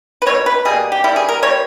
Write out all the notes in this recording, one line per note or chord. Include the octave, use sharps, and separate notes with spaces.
B4
B2 G3 A#3 C#5
B4
B2 G3 A#3 G#4
G4
E3 G3 A#3 E4
G#4
A#4
E3 G3 A#3 C#5